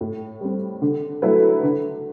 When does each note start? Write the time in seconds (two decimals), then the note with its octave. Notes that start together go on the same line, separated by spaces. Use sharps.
0.01 A2
0.41 G3 C4
0.82 D3
1.22 F#3 A3 E4 B4
1.63 D3